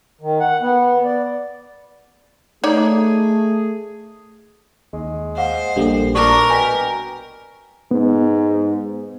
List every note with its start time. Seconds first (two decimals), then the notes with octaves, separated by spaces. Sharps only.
0.21 D#3
0.40 F#5
0.61 B3
1.04 D5
2.64 A3 D#4 G#4 C#5 D5
4.93 D#2 G#3
5.38 C5 F5 F#5
5.76 A#1 G3 A#3 D4 A4
6.15 D4 A#4 C#6 D6
6.50 B2 G5 G#5 B6
7.91 G#2 B3